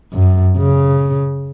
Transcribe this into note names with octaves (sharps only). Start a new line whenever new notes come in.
F#2
C#3